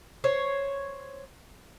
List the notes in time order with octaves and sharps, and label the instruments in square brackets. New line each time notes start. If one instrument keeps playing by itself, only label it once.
[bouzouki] C5 C#5